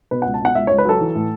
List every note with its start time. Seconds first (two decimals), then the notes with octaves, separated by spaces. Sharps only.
0.11 B2 B4
0.22 C#2 F#5
0.34 A5
0.41 B2 F#5
0.55 C#2 E5
0.67 C#2 C#5
0.78 B4
0.85 F#3 A4
1.01 E3
1.15 A2